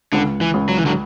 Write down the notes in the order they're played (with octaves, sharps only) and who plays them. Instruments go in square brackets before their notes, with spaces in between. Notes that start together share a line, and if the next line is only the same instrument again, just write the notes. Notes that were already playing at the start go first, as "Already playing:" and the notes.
[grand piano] C#2 [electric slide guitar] D3
[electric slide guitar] E3
[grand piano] C#2
[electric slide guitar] F#3
E3
D3 F#3